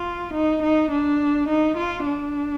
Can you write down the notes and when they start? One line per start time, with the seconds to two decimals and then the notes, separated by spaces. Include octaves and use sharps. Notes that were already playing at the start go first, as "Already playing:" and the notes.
Already playing: F4
0.34 D#4
0.63 D#4
0.91 D4
1.49 D#4
1.77 F4
2.06 D4